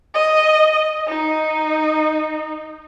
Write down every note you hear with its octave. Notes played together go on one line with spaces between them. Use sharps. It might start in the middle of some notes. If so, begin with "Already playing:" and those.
D#5
D#4